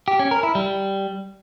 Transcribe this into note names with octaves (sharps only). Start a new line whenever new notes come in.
G4
C#4
A#4
E4
G3